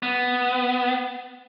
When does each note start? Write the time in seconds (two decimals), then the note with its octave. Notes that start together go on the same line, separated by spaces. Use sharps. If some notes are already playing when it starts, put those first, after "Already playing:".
0.03 B3